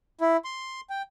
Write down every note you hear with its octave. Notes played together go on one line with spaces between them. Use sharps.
E4
C6
G5